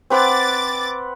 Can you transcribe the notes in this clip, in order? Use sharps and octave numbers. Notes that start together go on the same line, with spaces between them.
C4 B4 F#5 D6 A6